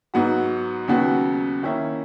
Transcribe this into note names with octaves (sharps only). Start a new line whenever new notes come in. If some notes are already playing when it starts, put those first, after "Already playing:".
G#2 F#3 B3 F#4
D#2 C#3 F#3 B3 F#4
D#3 A#3 C#4 E4